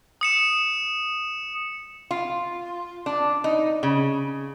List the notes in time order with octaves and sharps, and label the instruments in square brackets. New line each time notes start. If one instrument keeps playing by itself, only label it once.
[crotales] D#6 C#7 E7
[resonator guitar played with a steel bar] F4
D4
D#4
C#3